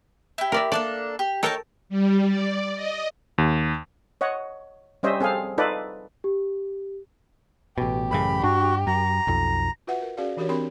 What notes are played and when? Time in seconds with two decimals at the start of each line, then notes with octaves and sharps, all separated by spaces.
0.38 E4 G4
0.52 A#4 D5 E5
0.72 A#3 D4 A4 D5
1.19 G4
1.43 D#4 A4 A#4 C#5 G5 A5
1.89 G3
2.27 D5
2.75 D#5
3.38 D#2
4.21 C#5 D#5 F#5
5.03 G3 C#4 C5 D#5 E5
5.20 C4 G#4 A4 F5
5.58 D#4 F4 A4 B4 D5
6.24 G4
7.78 A1 B2 G4
8.11 A1 F#2 C#3 B5
8.43 G2 D4 F#4
8.87 F#2 A#5
9.27 B1 F2
9.87 F4 F#4 B4 E5 F#5
10.02 A#4
10.17 C#4 F#4 G#4 D5 F5
10.37 E3 D4 F#4 G4 A#4 C#5
10.49 C4 D4 G4 A#4 B5 C6